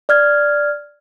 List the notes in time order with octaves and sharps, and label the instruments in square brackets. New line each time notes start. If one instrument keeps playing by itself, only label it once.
[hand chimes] D5 F6 G#6